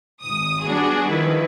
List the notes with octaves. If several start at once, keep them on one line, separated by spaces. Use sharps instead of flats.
G#1 D#6
G3 B3 D4 F#4 G#4
D#3 F3 E4 B4